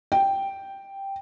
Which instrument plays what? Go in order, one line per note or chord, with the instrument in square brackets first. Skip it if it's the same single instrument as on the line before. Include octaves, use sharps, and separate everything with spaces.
[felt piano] G5